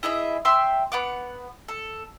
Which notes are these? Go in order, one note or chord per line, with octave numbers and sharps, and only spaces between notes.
E4 G#4 D#5 E5
E5 G5 C6 E6
B3 F#5 D6
A4